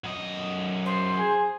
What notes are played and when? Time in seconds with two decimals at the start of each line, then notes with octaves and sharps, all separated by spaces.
0.04 F#2 D#5
0.85 C5
1.17 G#4